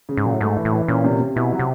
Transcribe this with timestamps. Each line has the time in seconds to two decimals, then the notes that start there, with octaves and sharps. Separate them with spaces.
0.09 C#3
0.17 G#2
0.25 A#2 F#3
0.33 A2
0.41 G#2 A3
0.57 E3
0.65 A2
0.72 E3
0.88 A#2 C#4
1.04 C3
1.21 C3
1.36 B2 E4
1.52 F#3
1.59 C3